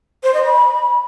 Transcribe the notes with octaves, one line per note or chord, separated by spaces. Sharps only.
C5
D#5
B5